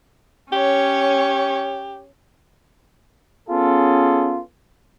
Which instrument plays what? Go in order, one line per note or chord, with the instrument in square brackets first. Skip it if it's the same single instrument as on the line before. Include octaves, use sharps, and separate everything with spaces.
[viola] C#4 C#5 [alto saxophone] G4
[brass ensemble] B3 C#4 F4 G#4 A4